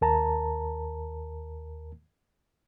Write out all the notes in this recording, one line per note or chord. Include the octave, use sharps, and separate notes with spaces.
D#2 A#4 A5 A#5